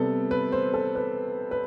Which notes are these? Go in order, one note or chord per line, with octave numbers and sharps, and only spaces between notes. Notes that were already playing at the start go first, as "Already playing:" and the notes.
Already playing: C3 G3 B3 A4
B4
C5
A4
B4
B4